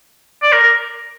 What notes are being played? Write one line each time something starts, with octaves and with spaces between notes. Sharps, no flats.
D5
A#4
A#4